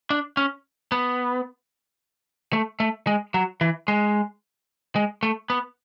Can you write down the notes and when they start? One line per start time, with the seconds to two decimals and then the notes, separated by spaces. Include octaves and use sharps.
0.10 D4
0.37 C#4
0.92 B3
2.53 A3
2.80 A3
3.07 G#3
3.34 F#3
3.61 E3
3.88 G#3
4.96 G#3
5.23 A3
5.50 B3